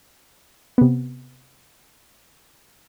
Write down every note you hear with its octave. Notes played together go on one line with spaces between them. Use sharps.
C3 B3